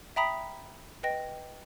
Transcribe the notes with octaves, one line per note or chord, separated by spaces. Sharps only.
E5 G5 A#5 B5 D#6 B6
B4 D#5 G5 A#6